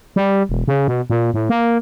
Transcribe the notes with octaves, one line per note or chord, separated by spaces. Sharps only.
G3
E1
C#3
B2
A#2
A2
A#3